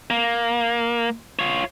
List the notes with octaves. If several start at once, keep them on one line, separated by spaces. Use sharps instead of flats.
A#3
F4 C#5